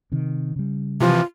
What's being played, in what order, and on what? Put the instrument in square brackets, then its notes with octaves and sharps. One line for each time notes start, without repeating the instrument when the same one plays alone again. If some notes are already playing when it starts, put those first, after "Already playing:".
[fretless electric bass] C3 D#3
C#3 G3
[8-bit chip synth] C3 E3 F3 [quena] F4